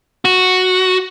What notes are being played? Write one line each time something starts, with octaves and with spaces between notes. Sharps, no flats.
F#4